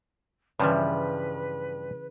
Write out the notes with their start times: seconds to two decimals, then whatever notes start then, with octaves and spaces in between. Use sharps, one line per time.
0.60 G2 C#3 E3 F3 G3 B4